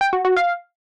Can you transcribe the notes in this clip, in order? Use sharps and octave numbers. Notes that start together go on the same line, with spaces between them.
G5
F#4
F#4
F5